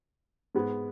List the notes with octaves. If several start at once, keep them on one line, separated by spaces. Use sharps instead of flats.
G#2 G#3 B3